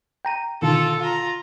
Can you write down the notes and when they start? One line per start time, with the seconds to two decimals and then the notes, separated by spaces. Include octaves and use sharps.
0.25 G5 A#5 D#7
0.62 B2 D3 D#3 F4 A4
1.00 F4 A#5